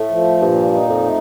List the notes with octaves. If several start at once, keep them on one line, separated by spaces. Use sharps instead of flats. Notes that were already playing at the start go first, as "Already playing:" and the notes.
Already playing: A2 A3
F3
G2 A#2
D#4
F2
A3